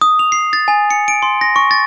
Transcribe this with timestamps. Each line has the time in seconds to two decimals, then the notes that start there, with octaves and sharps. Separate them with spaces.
0.01 D#6
0.19 F7
0.32 C7
0.53 A6
0.68 G#5
0.91 C#7
1.08 D7
1.22 C6
1.41 A#6
1.56 C#6
1.71 A6